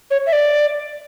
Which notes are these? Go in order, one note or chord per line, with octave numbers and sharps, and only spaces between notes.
C#5
E5
D5